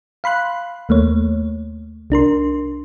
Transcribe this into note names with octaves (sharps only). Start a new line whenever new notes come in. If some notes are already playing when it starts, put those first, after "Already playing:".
F5 B5 C6 F#6
D#2 A3 A#3 C#5
C2 D4 A#4 C6